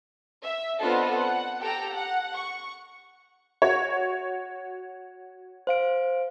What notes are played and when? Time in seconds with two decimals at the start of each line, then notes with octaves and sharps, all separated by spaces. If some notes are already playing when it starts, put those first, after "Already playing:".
0.43 E5
0.81 B3 C4 D4 F4 A4 D#5
1.16 F#5
1.60 G4 A4 G5 A#5
1.92 F#5
2.34 C#6
3.62 F#4 C#5
5.67 C5 F5 D7